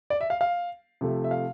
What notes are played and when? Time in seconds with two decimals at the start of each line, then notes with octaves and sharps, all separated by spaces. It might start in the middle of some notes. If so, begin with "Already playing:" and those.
0.10 D5
0.21 E5
0.30 F5
0.41 F5
1.01 C3 F3 A3
1.24 E5
1.31 F5